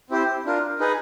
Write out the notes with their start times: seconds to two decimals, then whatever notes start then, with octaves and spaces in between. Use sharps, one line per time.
0.10 C4 E4 G4 C5
0.45 D4 F4 A#4
0.80 D#4 G#4 B4 D#5